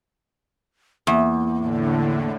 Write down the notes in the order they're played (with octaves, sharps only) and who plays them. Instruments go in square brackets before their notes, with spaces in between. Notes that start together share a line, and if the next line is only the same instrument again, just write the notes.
[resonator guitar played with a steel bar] E2 [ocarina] A#3
[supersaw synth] A2 D3